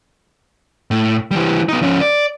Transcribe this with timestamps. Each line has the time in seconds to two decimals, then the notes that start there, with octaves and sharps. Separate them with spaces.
0.91 A2
1.31 E3 G3
1.69 B3 D#4
1.81 F3 C#4
2.01 D5